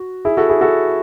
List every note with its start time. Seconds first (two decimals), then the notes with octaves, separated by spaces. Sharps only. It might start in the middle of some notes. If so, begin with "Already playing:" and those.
Already playing: F#4
0.25 E4 G#4
0.37 F#4 A4
0.49 E4 G#4
0.61 F#4 A4